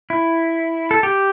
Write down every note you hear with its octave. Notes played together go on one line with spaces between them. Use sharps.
E4
A4
G4